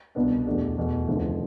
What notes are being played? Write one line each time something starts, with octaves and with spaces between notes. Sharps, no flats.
C2 B2 B3 D4
E2 B2 A3 D4 G4
E2 B2 A3
F1 E2 D3 F3